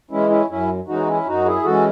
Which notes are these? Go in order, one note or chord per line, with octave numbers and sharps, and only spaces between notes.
E3 G#3 C#4 E4
C#4 E4
F#2 C#4 E4
E3 G#3 C#4 D#4 F#4
C#4 E4
F#2 D#4 F#4
E4 G#4
E3 G#3 C#4 F#4 A4